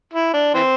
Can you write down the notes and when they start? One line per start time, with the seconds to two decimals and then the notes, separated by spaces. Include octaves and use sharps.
0.14 E4
0.34 D4
0.54 E3 C4